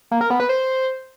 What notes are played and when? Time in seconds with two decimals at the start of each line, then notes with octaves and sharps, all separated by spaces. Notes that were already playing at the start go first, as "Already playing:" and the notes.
0.11 A#3
0.21 A#4
0.30 B3
0.40 B4
0.49 C5